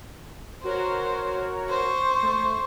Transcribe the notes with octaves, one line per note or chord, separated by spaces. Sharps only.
F#4 A#4 C5 C#5
C5 C#6
A3